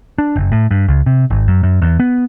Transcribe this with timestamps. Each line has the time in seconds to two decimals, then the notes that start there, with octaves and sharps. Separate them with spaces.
0.18 D4
0.36 F#1
0.52 A2
0.71 G2
0.88 C#2
1.06 C3
1.30 G#1
1.48 F#2
1.63 F#2
1.82 E2
2.00 B3